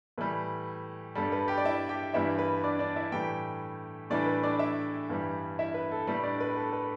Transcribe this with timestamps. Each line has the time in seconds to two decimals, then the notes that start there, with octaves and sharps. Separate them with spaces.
0.18 A2 E3 G3 B4
1.15 G2 G3 A4
1.32 B4
1.48 G4 G5
1.57 D5
1.65 E4 E5
1.89 G4 G5
2.13 G2 E3 G3 E4 E5
2.39 B4
2.64 D4 D5
2.79 D4 D5
2.96 E4 E5
3.12 A2 E3 G3 G4 G5
4.10 A2 E3 G3 D4 D5
4.27 B4
4.43 D4 D5
4.59 E4 E5
5.10 G2 E3 G3
5.59 E4 E5
5.74 B4
5.92 A4
6.07 A2 G3 B4
6.23 D4 D5
6.40 B4
6.56 A4
6.73 B4